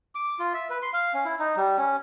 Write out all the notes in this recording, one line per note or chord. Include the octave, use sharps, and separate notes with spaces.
D6
F4
E5
B4
C6
F5
C#4
E4
D#4
G3
C#4